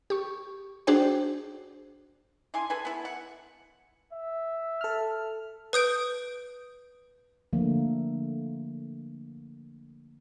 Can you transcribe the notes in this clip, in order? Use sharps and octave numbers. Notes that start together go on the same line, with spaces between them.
G4 C#6
D4 F#4 G#4 C5 G5
D3 E4 G#5 C6
G#4 A4 B4 G#5
B3 E4
F#5
E5
A4 F6
B4 D#6 G6 D7
D3 F3 A3 A#3